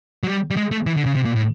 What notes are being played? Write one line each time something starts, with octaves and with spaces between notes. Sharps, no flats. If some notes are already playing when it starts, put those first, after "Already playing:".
F#3
G3
G3
G#3
A3
E3
D3
C#3
C3
A#2
A2